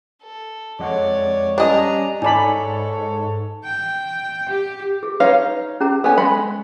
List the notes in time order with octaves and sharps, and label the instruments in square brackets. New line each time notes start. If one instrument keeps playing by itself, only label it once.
[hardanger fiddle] A4
[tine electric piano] F2 G#3 F#5 [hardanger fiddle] C#5 D5
[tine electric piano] G3 C#4 [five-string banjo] D4 D#5 [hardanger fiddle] G#4 A#5
[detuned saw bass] G#2 [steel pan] D#4 D5 B5 [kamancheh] A4 C#5 [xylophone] G#5 A5
[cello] G5
G4
[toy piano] G#4
[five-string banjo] D#4 C#5 F5 [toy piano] B4
[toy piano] C#4 G#4 A#5
[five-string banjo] B3 C#4 G#5 [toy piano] A4
[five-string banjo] G#3 B5 [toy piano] G5